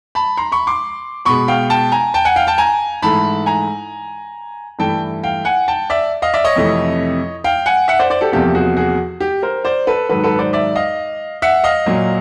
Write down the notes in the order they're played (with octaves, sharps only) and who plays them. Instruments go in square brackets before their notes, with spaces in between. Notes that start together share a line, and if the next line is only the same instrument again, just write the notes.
[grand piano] A5 B5
A#5 C6
B5 C#6
C6 D6
B2 G#3 B5 C#6
F5 G5
G5 A5
G#5 A#5
G5 A5
F#5 G#5
F5 G5
G5 A5
G#5 A#5
G#2 E3 A3 A5 B5
G#5 A#5
G2 E3 A3 G5 A5
F5 G5
F#5 G#5
G5 A5
D5 E5
D#5 F5
D5 E5
C#5 D#5
F2 C3 E3 A3
F5 G5
F#5 G#5
E5 F#5
C5 D5
C5 D5
G4 A4
E2 C3 F3 A#3 G4 A4
F#4 G#4
F#4 G#4
G4
A#4 C5
C5 D5
A4 B4
G#2 D#3 F#3 A4 B4
A4 B4
C5 D5
D5 E5
D#5 F5
E5 F#5
D#5 F5
A#2 F#3 A#3